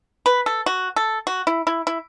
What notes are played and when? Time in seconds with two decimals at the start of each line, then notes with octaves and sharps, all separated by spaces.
0.26 B4
0.46 A4
0.66 F#4
0.96 A4
1.27 F#4
1.47 E4
1.67 E4
1.87 E4